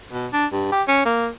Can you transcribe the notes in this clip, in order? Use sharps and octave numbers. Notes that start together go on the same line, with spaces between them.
B2
D4
G2
G4
C#4
A#3